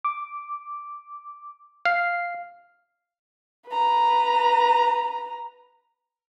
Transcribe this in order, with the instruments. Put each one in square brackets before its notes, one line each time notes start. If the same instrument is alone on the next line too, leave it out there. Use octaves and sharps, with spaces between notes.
[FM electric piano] D6
[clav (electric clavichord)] F5 [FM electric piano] C7
[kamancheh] B4 A#5